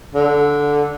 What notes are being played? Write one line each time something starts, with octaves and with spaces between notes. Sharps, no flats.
D3